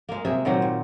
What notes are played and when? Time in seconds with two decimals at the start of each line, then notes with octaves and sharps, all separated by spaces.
0.09 G#3 A#3
0.25 C3 G#3 G#4 E5
0.45 A#2 D#3 F#3 C4
0.62 A#2